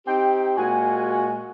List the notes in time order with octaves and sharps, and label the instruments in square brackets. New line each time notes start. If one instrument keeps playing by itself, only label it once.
[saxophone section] C4 D#4 G4 [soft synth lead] G5
[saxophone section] A#2 G#3 F#4 [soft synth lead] G#5